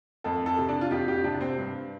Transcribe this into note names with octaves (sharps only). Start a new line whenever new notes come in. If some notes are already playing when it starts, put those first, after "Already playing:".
F2 A4
A4
C3
D4
F4
F2 G4
G4
C3 D4
C4
G2